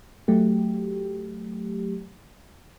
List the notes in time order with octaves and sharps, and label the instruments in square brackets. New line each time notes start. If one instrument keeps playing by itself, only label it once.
[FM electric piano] F#3 A3 G4